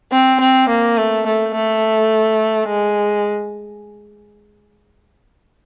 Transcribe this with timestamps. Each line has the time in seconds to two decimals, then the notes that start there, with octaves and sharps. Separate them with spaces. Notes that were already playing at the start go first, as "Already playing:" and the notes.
0.12 C4
0.40 C4
0.69 A#3
0.97 A3
1.26 A3
1.55 A3
2.69 G#3